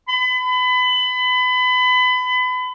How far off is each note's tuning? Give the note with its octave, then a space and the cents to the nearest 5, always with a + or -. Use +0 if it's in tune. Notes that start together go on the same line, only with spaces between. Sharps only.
B5 +30